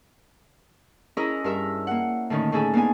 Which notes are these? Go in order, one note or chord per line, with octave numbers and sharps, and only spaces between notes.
C#4 E4 G#4 A#4 D#5 A#5
G2 A#4 E5
A#3 F#5
A2 D3 D#3 C#4 D#4
A2 A3 C#4 G#4 A4 G#5
A#3 B3 D4 D#4 G#5